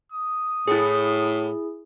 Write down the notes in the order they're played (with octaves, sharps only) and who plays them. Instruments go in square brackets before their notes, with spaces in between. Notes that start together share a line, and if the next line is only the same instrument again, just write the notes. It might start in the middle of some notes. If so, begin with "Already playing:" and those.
[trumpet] D#6
[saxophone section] A2 [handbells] E4 G#4